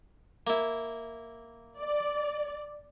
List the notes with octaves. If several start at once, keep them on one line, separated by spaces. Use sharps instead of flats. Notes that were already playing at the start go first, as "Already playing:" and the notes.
A#3 E4
D5